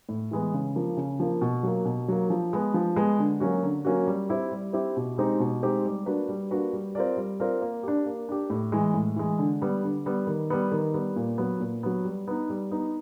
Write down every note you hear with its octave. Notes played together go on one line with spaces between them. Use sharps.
A2
E3 G#3 B3
C#3
F3 A#3
C#3
F3 A#3
B2
F#3 A#3
B2
F#3 A#3
F3
G#3 B3
F3
G#3 B3
D3
F#3 A#3 C#4 F#4
D3
F#3 A#3 C#4 F#4
G3
C4 E4 G4
G3
C4 E4 G4
B2
G#3 C4 D#4 G4
B2
G#3 C4 D#4 G4
G3
A#3 D4 F#4 B4
G3
A#3 D4 F#4 B4
G3
C4 F4 A#4 D5
G3
C4 F4 A#4 D5
A#3
D4 G4
A#3
D4 G4
A2
E3 G#3
A2
E3 G#3
D3
G3 B3
D3
G3 B3
D#3
G3 B3
D#3
G3 B3
A#2
F#3 B3
A#2
F#3 B3
G3
B3 D#4
G3
B3 D#4